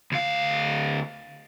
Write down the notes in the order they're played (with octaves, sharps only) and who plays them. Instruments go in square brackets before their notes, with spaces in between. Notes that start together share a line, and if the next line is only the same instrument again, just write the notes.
[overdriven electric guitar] D2 F5